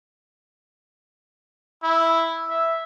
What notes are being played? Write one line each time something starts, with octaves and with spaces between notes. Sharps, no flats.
E4
E5